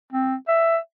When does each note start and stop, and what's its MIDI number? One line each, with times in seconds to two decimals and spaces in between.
0.13 0.35 60
0.48 0.77 76